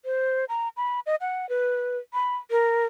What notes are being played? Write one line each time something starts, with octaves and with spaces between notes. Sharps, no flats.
C5
A#5
B5
D#5
F#5
B4
B5
A#4